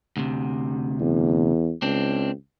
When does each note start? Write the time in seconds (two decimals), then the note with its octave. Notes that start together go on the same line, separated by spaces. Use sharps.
0.17 D2 C3
1.01 E2
1.82 C#2 C4 D4